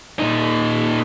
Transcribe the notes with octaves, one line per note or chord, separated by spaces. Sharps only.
A#2 D#4